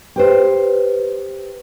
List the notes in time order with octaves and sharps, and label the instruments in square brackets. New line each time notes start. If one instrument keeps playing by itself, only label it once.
[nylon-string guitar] G4 B4 C5